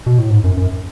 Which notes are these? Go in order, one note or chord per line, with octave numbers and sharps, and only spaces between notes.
B2
A2
G#2
F#2
F#2